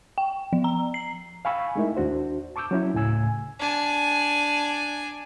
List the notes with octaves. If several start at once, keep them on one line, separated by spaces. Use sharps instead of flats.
G5
F3
A#5
C7
F5 G5 G#5 B5 C#6 E6
G#3 A3 D#4 E4 A#4 E5
D#2 D4 F#4 C5
A5 C#6 D6 E6 G6
F#3 C#4 E4
D2 A2 C#3 G#5 E6 G#6
D4 G#5